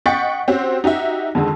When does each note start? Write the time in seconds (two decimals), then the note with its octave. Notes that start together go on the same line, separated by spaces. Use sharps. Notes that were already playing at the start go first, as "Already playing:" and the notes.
0.06 D#5 F#5 G5 C#6 A6 B6
0.48 C4 C#4 F#4 G4 C5
0.84 D#4 F#4 G4 E5
1.35 F2 D3 D#3 G#3